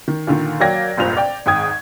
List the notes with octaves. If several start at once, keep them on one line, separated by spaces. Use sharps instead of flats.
D#3
A#2 D3 D#3
F#3 A#3 D5 G5 G#6 A#6
F1 A#1 G2 A#2 C5 F7
D5 G5
G#1 G#2 G5 D#6 G#6